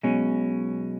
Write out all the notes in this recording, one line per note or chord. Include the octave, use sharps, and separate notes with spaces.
B1 B2 G#3 C#4